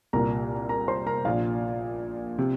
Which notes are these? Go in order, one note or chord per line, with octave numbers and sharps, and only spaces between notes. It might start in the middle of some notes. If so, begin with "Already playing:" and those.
C2 A#2 A#4 A#5
A#4 A#5
C5 C6
A#4 A#5
A#1 A#2 F4 F5
C3